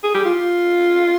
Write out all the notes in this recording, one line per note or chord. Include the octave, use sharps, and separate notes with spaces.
G#4
G4
F4